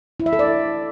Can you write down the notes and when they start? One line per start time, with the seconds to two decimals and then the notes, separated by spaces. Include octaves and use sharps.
0.20 E4
0.26 E5
0.33 A4
0.39 D5